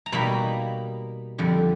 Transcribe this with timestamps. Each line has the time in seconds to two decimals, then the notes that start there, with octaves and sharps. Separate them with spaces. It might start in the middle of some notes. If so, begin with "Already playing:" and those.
0.06 A#5
0.12 B2 G3 A#3 D#4 B5
1.38 F2 D3 G3